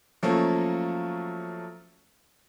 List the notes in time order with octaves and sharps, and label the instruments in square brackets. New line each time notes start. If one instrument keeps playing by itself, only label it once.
[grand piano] F3 F#3 A3 A#3 C#4 A4